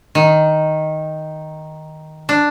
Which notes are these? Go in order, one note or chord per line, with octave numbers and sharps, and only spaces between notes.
D#3
D4